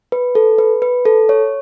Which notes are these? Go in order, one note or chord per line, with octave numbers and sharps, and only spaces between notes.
B4
A4
B4
B4
A4
C#5